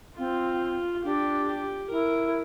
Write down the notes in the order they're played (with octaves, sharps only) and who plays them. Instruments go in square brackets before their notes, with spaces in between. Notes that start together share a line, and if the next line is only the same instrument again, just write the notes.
[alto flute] C4 [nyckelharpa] F4
[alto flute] D4 [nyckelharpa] G4
[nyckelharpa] G4
[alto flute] E4 [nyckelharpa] A#4